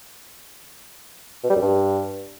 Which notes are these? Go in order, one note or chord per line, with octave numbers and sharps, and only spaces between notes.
B2
G3
F#2
G2